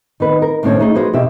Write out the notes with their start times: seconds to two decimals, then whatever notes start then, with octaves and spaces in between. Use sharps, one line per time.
0.20 D#3 B3 B4
0.42 A#4
0.63 D#2 A2 D3 C#4 C5 C#5
0.79 A3 D#4 G#4
0.95 F3 F#4 G#4 B4 C5
1.13 E2 B2 G4 E5